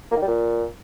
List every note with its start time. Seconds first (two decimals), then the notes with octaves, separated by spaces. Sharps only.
0.11 A#3
0.17 D#3
0.22 G3
0.27 A#2